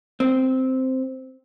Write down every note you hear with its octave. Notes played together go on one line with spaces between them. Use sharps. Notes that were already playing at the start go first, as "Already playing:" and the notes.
C4